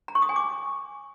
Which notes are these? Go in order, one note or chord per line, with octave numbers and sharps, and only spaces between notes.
A#5
C#6
D#6
G#5
D6